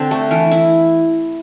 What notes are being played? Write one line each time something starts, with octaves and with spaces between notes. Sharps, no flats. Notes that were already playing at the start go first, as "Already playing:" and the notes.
Already playing: D3 C4
A3
E3
E4